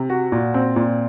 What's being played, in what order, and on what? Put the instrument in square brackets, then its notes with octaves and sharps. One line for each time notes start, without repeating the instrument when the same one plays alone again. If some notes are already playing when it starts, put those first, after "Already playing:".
Already playing: [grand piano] C3
F#4
A#2
C4
A#2